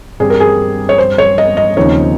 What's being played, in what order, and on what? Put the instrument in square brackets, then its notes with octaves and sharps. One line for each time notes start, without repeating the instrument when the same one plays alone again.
[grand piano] G2 G3 C4 [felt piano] G#4
[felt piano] A#4
G#4
C#5
C5
C#5
D#5
D#5
[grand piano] D#2 C#3 F3 C4 D#4 [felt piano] C#5